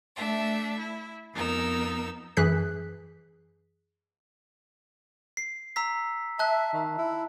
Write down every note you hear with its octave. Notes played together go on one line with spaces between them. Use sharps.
A3 D4 E5
E4
F2 B3 D#4 A#4 E6
F#2 E3 G#4 F#6 B6
C7
A#5 E6 B6
E5 A5 F#6
D#3
E4